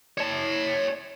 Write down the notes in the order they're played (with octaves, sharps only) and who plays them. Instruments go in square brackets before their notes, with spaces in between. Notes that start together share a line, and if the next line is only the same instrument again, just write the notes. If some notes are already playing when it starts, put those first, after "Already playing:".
[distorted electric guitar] C#5 A5